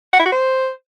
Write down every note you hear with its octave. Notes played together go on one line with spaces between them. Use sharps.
F#5
E4
F#4
C5